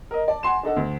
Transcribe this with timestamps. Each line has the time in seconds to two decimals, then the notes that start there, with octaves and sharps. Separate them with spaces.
0.11 A#4 D#5
0.28 D5 A5
0.43 F#5 G#5 C6 E7
0.63 D4 D#4 A4 F#5
0.76 D2